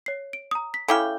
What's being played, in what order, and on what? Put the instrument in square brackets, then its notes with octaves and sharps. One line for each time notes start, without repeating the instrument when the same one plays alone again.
[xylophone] C#5 C7
D7
A#5 D#6
B6
[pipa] C#3 E4 G5 [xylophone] A4 D6 F6